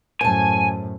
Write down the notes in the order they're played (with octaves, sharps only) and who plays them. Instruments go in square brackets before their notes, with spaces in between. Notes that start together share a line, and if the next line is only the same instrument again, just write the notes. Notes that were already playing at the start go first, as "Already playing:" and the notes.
[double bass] F#2 A2 [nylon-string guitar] C5 A5 [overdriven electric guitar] G#5